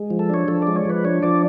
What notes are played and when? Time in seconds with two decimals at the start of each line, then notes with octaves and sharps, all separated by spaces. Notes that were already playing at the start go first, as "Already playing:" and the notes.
Already playing: G#3
0.10 F3
0.19 A4
0.30 D4 C#5
0.48 F3 A4
0.62 G#3 D5
0.76 C#5
0.85 F3 B4
1.05 D4 C#5
1.23 F3 D5